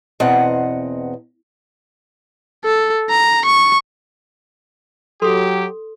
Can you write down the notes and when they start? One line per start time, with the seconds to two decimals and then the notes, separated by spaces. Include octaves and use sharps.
0.20 E2 B2 C4 D#5 F#5
2.65 A4
3.10 A#5
3.45 C#6
5.22 F#3 G4 A4 C6